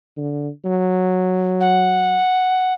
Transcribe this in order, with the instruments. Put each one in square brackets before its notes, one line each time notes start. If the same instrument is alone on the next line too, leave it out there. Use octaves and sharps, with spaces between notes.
[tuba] D3
F#3
[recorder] F#5